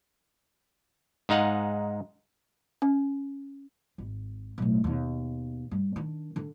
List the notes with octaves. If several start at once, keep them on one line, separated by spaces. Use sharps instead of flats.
G#2 G#3 D#4 F5 F#5
C#4
G#1
B1 A2
D#2 B2
G2
D#3 D4
D3 D4